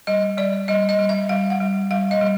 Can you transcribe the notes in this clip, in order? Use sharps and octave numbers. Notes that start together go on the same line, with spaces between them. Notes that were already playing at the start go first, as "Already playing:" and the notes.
G3 D#5
G3 D5
G3 D#5
D#5
G3
E5
G3 F5
F#5
G3
G3 F5
D#5
G3